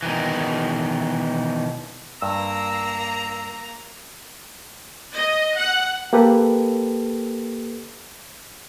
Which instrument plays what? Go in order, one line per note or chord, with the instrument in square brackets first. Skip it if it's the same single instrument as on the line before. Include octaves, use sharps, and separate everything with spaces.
[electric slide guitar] B2 D#3 E3
[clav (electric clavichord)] G2 [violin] A#3 A#5 [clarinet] E6
[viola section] D#5
F#5
[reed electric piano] A#3 G4 A4 B4